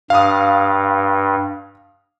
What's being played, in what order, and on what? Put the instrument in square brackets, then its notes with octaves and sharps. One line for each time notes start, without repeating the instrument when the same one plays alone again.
[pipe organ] G2 [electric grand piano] F5 D#6